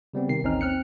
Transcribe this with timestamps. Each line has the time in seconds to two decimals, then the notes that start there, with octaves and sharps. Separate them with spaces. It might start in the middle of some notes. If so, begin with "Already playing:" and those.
0.14 C#3 G3 B3 C4
0.29 C3 D#3 C7
0.43 A1 D#2 C4 C#4 D#4 F6
0.61 C4 F6 F#6 C#7